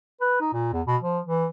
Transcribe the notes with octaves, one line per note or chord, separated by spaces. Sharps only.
B4
D#4
A#2
E2
B2
F3
E3